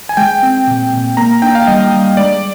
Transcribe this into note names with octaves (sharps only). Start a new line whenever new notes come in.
G#5
G#3 G5
C4
A#2
A#2
A#3 A#5
D4 G5
F5
G3 D#5
G3
G#3 D5